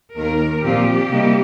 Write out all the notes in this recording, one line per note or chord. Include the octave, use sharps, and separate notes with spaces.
D#2 D#3 A#3 A#4
A#2 F3 C4 F4 G4
C3 G3 A#3 D#4